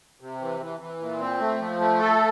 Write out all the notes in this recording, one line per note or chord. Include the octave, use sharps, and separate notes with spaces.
C3
E3
E3
E3
A#2
C4
A3
F3
A3
A4